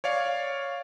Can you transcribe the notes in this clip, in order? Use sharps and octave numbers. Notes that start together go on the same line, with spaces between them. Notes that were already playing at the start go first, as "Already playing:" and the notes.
C#5 D5 F5